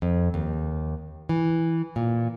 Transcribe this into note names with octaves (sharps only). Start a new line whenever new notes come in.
F2
D#2
E3
A#2